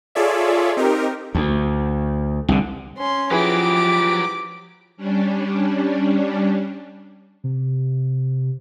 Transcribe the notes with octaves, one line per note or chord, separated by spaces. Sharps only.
F4 G#4 A4 C#5 D5 E5
C4 D#4 G4 A#4
D2
C2 D3
C#4 C6
F3 F#3 E4 G4 G#4 B4 D6
G3 C#4 D4
C3